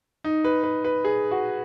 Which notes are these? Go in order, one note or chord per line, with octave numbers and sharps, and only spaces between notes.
D#4
B4
B4
B4
G#4
F#4